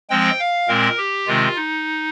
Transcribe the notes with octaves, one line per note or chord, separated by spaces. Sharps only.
F3 G#3 C4 G5
F5
A#2 G#3 C4 A#4
G4
C3 D#3 G#3 C4 F4
D#4